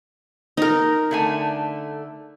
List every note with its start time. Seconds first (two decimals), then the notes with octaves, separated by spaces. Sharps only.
0.57 D#4 A#4
1.11 D3 A3 G#5